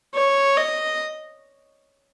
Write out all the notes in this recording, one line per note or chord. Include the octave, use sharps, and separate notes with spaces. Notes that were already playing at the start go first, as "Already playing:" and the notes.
C#5
D#5